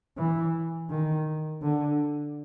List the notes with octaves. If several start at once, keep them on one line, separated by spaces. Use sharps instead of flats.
E3
D#3
D3